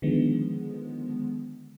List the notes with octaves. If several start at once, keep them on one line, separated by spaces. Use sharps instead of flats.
D3 D#3 F3 G#3 B3